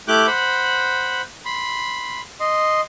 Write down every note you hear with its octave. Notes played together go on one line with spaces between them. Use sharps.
A3 E4 G4 D6 F#6 G6
C5 F#5 B5
B5 C6
D#5 C6